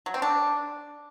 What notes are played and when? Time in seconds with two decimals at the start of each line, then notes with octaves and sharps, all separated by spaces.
0.06 F#3
0.14 C4
0.22 D4